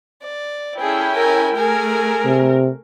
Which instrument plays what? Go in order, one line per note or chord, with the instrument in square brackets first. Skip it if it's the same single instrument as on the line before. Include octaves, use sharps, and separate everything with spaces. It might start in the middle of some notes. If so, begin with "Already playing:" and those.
[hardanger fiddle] D5
[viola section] C#4 E4 G5 [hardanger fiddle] G#4 A4
[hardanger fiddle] A#4 G#5
[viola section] A3 A#4 [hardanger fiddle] G#4 G#5
[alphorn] C3